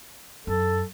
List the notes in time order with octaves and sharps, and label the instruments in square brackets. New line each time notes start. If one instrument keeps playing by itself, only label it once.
[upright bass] F#2 [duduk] A4